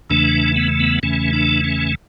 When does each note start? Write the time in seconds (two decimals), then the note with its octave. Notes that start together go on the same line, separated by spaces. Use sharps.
0.10 E2 C#3 E3 A3 D4
0.56 B3
0.80 B3
1.03 E2 C#3 E3 A3 C#4
1.33 D4
1.64 C#4